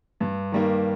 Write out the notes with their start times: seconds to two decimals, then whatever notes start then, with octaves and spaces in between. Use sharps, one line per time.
0.20 G2
0.52 D#3 G3 A#3